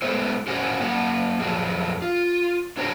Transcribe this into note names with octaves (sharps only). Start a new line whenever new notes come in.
G#3 A3 B3 E4 C5
C#4 E4 F#4 C5 F#5 G#5
F#2 A#3 F#5
F2 F3 F#3 G#4
F4
D4 F#4 C5 C#5 G5 A#5